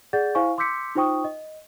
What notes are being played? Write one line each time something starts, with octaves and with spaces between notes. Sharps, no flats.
G#4 D5 F#5 G6 A6
E4 C5 F5 G#5 C#6
C6 D6 E6 G6 B6 C#7
D#4 F4 C5 G5 C#6 D#6
D#5